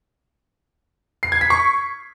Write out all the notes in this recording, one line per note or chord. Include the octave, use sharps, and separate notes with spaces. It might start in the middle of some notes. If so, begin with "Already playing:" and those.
C7
G#6
B6
C#6